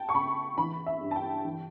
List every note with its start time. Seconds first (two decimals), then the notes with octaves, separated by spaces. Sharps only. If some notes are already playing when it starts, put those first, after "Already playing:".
Already playing: G5 A5
0.09 C#6
0.14 C#3 B5
0.58 E3 B5
0.86 E5
1.01 G2
1.11 A5
1.16 G5
1.45 E3